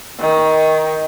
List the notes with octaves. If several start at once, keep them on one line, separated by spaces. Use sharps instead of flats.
D#3